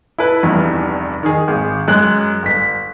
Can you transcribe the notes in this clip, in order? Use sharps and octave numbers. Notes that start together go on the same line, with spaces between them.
E4 A4 B4
F1 E2 G2 E3
D#3 D#4 G#4
G#1 G#4
F#2 G#3 F#6
G1 B6